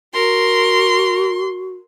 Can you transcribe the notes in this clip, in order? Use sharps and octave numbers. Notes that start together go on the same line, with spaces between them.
F#4 A#4 C6